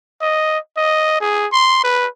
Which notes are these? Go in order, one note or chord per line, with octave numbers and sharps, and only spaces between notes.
D#5
D#5
G#4
C6
B4